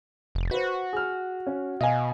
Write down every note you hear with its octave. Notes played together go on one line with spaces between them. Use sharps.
F1
F#4 B4 C5
G#4 F6
C#4
B2 D#5 F5 G#5